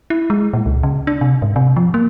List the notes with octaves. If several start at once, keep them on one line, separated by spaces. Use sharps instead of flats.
E4
G#3
A#2
C#2
C#3
D4
C3
G#2
C3
F3
A#3